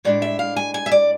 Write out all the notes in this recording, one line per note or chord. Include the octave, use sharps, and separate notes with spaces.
A2 G#3 D4 D5
E5
F5
G#5
G#5
E5
D5